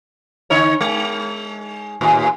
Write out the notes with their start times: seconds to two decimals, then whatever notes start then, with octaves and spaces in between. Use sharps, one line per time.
0.50 D3 D#4 C#5
0.81 G#3
2.01 D#2 A2